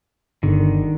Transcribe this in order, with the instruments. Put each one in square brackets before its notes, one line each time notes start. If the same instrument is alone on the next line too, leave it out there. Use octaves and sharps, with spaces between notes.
[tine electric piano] G1 [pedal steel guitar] D3 D#3